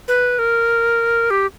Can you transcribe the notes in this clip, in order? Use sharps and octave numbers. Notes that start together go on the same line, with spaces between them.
B4
A#4
G4